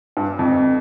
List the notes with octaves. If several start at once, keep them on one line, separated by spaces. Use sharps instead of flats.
G2
F2